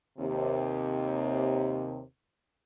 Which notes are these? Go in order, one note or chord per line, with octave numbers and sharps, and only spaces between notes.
D#2 C3